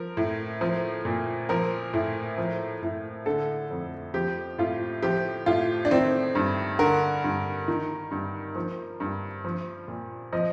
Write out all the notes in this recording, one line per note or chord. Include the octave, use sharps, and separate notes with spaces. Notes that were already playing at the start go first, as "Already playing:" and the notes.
Already playing: F3 A#4
A2
F3
A#2
F3 A#4
A2
F3
A2
D3 A4
F2
F3 G4
A2 F4
F3 G4
A2 F4
D4
D#3 C4
G2
D3 A#4
G2
D#3
G2
F3
G2
F3
A#2
F3 D#5